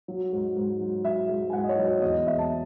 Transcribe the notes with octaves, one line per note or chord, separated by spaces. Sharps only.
F#3
G#2
G#2
F#3
F#3 E5
G#2
G#5
G#2 F#5
D#5
C#5
F#3
C#5
E2 D#5
E2 E5
A5